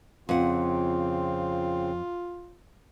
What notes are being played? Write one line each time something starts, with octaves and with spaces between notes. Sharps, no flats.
F2 C#3 C4 F4 F#5